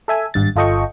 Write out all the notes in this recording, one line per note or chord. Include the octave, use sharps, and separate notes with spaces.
A4 E5 G#5
G#1 G2 A6
G1 F4 A4 D#5 G5 C#6